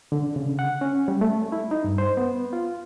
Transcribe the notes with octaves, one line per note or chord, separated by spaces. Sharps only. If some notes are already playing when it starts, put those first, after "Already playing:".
D3
C#3
F#5
C#4
G3
A3
E4
D#4
G2
C5
B3
F4